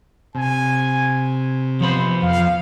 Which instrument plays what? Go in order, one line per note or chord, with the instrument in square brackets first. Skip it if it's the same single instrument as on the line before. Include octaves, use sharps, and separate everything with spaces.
[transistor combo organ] C3 [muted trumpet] G#5
[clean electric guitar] F3 B3 B5 [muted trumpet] C5
[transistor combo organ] F2 [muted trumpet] F5